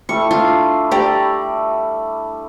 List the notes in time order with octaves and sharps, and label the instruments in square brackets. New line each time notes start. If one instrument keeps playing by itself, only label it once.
[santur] G3 A3 E4 [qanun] C#6
[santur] D4 [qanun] F4
[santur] G3 A3 [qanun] G4 D5 A#5